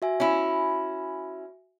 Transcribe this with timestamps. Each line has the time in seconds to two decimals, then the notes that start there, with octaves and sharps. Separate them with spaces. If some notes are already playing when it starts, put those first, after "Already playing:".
0.02 F#4 E5 G#5
0.20 C#4 E4